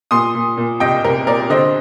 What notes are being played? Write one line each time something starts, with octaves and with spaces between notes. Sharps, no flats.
A#2 C6 D#6
A#2
A#2
C2 D#5 G5
C2 A#4
A#2 A#4 D5
D3 C5 D#5